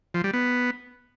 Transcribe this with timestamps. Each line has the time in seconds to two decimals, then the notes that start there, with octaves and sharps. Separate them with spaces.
0.14 F3
0.24 G3
0.33 B3